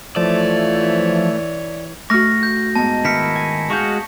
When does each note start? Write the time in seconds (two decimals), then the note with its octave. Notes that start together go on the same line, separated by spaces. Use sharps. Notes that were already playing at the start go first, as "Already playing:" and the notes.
0.16 E3 F3 A3 C#5 D5
2.10 A3 F#4 C#6 F6 A#6
2.43 G6
2.75 G#2 B3 A5
3.05 D#3 E4 F6 B6 C#7
3.35 G#5
3.70 G#3 F#4 F5 C#6 G6